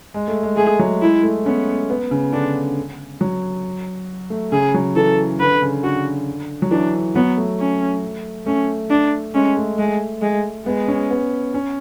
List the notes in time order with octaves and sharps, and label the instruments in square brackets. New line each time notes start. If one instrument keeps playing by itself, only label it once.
[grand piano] G#3
A3
G#3
[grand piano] A3 [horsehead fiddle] G#4
[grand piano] F#3
[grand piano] G#3 [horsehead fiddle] E4
[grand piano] A3
[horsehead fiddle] B3 [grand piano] C#4
[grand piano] B3
C#3
[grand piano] D3 [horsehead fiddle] D4
[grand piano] F#3
A3
[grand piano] C#3 [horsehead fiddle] G#4
[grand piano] F#3
[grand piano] E3 [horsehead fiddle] A4
[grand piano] D3 [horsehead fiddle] B4
[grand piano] D3
C#3
[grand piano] D3 [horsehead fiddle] F#4
[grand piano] F#3
[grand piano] E3 [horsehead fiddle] D4
[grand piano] F#3 [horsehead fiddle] B3
[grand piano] A3
[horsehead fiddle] C#4
[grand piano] A3 [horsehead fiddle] C#4
[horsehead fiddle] D4
[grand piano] G#3 [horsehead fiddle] C#4
[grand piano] A3
[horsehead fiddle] G#3
G#3
[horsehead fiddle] G#3 [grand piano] B3
[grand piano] C#4
B3
C#4